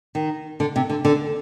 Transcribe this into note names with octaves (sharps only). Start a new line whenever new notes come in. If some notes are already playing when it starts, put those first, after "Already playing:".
D#3
D3
C3
D3
D3